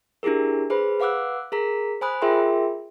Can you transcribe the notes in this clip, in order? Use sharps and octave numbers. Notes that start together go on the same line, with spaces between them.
D4 E4 G4 G#4 A#4
G#4 B4 C5 B5
B4 F5 F#5 D6 E6 F#6
G#4 A#4 A#5 B6
C5 G#5 B5 D#6 F#6
F4 G#4 A#4 E5 G5 C6